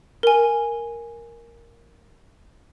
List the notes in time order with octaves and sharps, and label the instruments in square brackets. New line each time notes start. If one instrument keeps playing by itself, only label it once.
[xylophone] A#4 G#5